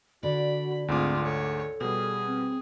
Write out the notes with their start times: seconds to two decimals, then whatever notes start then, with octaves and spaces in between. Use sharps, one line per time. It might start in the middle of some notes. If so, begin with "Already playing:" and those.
0.23 D3 F#4 D5 B5
0.88 D2 G#2 C4 F4 G#4 D6
1.24 A4 C#5
1.81 B2 G3 G#4
2.26 C4